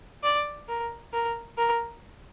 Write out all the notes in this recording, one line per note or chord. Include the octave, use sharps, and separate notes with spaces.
D5
A#4
A#4
A#4